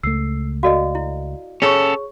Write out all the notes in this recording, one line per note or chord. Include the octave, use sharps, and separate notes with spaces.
C#2 A3 E6 C7
F#4 A4 D5 D#5 F5
E4
C#4 G#4 A4 C#5 C#6